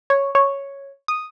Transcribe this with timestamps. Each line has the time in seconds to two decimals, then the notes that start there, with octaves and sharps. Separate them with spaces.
0.10 C#5
0.35 C#5
1.08 D#6